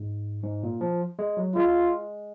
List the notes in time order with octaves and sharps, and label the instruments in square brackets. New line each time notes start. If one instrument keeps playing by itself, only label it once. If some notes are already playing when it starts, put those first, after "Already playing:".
Already playing: [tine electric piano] G#2
G#2
A#2
F3
G#3
F#3
[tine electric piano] G#3 [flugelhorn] F4